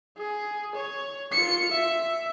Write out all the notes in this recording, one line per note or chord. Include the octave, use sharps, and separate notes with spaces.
G#4
C#5
F4 C#7
E5